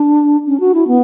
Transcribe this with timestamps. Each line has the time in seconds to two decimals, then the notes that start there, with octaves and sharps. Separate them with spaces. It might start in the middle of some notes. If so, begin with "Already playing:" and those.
Already playing: D4
0.47 C#4
0.60 F#4
0.75 E4
0.87 B3